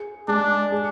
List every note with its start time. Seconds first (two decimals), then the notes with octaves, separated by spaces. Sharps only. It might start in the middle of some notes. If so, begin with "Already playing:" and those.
Already playing: G#4
0.28 G#3 D4
0.72 G#4